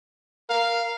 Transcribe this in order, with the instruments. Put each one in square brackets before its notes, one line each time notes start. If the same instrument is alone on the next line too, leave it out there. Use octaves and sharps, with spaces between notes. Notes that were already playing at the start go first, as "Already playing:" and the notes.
[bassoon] A#4 [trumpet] F5